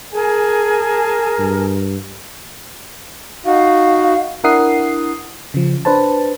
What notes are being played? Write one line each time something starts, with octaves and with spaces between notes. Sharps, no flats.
G#4 A#4 G#5 A5
G2
D#4 F#4 F5
D4 E4 A#4 F#5 D#6 C7
C#3 F3
D4 B4 C5 A5